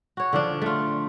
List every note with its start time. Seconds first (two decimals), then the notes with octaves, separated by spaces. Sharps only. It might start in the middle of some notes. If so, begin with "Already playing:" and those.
0.17 F#4 C#5
0.33 D3 F3 D4
0.62 A3 F4